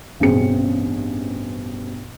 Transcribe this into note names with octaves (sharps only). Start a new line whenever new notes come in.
A1 G2 B2 C4 G#4 C#7